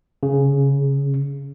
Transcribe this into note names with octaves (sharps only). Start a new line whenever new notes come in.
C#3